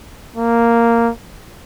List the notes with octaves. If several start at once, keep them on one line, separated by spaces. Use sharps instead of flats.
A#3